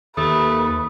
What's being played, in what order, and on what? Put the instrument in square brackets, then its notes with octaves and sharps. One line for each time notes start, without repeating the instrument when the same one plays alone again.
[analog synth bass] D#2 [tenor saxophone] A3 [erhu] B4 [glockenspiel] D#6